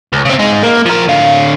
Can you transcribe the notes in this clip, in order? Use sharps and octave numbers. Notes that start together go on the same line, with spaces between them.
C#2
C#3 C4
G#3 D#4
A#3
F3 A#4
D3 F5